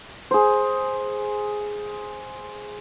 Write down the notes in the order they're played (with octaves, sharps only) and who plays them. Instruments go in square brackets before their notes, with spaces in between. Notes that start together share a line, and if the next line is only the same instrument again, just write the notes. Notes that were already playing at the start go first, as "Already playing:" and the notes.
[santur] G#4 C5